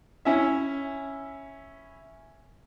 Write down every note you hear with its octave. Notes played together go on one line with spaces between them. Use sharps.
C#4 E4 E5